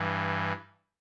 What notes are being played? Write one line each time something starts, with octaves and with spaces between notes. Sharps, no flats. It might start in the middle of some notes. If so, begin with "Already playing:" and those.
Already playing: G2 E3